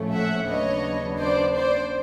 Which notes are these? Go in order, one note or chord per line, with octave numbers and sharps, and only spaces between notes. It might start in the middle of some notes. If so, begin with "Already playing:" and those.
Already playing: A#1 A2 F3 A3 C#4
E5 F#5
D#2 C#3 F#3 B3 D4 C#5 D#5
C5 D5
C5 D5